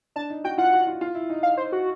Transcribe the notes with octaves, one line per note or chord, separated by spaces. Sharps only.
D4 A5
D#4
F#4 G5
F4 F#5
F#4
F4
F4
E4
D#4
F5
C5
F#4